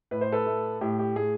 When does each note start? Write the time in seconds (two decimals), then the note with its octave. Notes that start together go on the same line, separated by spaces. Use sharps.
0.11 A2 B4
0.21 C5
0.32 A4 B4
0.46 A3
0.81 A2 G4
0.99 G4
1.16 A2 G#4